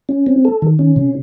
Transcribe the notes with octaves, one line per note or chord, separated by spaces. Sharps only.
C#4
C4
A4
D#3
C#4
C3